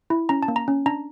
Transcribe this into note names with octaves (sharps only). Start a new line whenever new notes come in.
E4
C#4 A#5
A5
A#3
A#5
C#4
D4 A#5